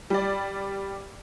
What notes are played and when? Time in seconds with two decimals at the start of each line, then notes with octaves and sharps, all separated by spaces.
0.10 G3 D5